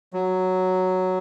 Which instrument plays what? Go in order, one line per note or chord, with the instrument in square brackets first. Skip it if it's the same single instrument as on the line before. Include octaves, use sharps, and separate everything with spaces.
[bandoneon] F#3